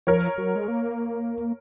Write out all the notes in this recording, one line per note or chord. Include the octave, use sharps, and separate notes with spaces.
F3 A#4 C#5
F#3
G#3
A#3